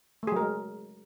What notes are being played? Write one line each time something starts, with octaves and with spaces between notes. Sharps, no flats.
F#3 G#3 A3 G#4 A#4